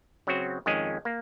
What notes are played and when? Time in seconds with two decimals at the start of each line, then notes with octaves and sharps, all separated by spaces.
0.27 C#3 F#3 C4 F#4
0.66 F2 D#3 G#3 C#4 G#4
1.05 A#3